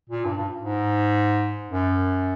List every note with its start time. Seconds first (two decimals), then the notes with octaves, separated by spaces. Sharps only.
0.09 A#2
0.25 G2
0.36 G2
0.60 G#2
1.69 F#2